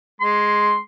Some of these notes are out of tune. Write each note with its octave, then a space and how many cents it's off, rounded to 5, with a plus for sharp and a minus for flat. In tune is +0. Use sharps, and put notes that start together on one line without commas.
G#3 +0 C6 +0